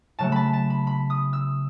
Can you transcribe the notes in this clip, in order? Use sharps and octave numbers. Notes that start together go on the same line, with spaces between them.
C#3 F#3 A3 A5
A5 B5
A5
B5
B5
D#6
E6